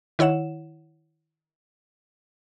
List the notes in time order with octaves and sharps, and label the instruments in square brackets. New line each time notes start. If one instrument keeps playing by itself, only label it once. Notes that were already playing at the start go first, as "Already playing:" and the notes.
[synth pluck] D#3 E4 C#5 F#5 E7